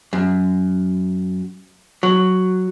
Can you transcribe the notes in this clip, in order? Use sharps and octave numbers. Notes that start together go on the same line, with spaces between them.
F#2
F#3